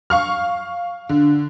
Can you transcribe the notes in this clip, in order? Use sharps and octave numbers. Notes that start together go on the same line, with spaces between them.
F5 C#6 F6
D3